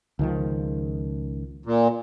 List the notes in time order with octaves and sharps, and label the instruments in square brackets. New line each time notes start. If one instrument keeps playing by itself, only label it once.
[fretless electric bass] C#2 D#3 F3
[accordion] A#2